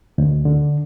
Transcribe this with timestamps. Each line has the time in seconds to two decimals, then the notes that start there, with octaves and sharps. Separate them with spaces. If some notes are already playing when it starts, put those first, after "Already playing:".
0.18 D2
0.45 D3